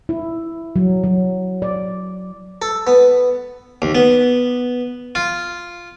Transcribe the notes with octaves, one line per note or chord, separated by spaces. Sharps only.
E4
F#3
F#3
D5
A4
B3
D#2
B3
F4